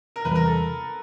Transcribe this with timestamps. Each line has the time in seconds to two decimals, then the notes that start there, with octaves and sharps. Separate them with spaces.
0.16 A#4
0.25 E2 C3 E3 G3 B4
0.35 A#4
0.47 A4